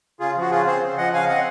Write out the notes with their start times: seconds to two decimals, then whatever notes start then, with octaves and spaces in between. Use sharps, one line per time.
0.20 C#3 F4 G#4
0.36 F3
0.41 F#4
0.51 C#3 F4 G#4
0.66 C4 G#4 C5
0.82 C#3
0.98 F3 D#5 F#5
1.14 C#3 F5 G#5
1.29 C4 D#5 F#5